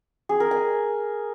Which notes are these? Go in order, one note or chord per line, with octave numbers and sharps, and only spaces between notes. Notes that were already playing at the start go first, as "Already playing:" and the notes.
G#4
A#4
G#5